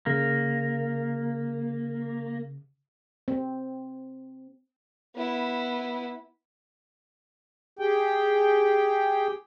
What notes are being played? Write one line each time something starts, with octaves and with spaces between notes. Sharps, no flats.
C#3 A#3
C4
B3 E4
G4 G#4 G5